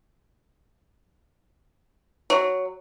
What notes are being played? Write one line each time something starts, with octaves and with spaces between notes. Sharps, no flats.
F#3